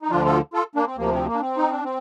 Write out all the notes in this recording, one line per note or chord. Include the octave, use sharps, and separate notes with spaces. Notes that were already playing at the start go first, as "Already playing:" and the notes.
D#4
D2 D3 F3 D4 F4
F4 A4
F4 A4
A#3 D4
C4
D2 C3 F3 A#3
C4
A#3
D4
C4
D#4
D4
C4